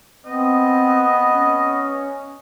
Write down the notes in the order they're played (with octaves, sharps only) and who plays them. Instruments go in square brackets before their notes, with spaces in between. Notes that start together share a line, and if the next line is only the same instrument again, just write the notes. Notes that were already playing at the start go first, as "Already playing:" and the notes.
[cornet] B3 [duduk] C4 [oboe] D#5
[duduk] C#4